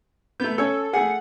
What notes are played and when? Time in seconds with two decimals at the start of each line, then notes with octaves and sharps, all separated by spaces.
0.40 A3 B3 G6
0.58 C#4 A4 C#5
0.93 A3 G#4 F#5